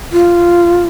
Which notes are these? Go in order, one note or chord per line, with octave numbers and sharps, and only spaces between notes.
F4